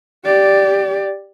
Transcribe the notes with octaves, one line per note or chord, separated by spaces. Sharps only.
G4 D5